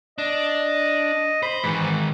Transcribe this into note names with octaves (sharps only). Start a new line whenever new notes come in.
D4 D#5
C5 B5
G#2 D#3 E3